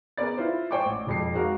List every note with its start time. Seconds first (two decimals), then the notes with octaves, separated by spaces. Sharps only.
0.17 B3 G#4 A#4 D5 A6
0.37 E4 F4 B4 C5
0.71 C5 D5 G5 G#5 C#6 D6
0.86 A1
1.07 E1 F2 C7
1.34 G#3 C4 F#4 A#4 F5